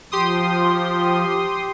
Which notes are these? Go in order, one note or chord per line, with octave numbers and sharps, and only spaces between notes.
F3 G4 C6 D#6